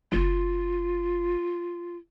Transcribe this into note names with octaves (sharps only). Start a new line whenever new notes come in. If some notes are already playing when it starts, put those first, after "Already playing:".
F#1 F4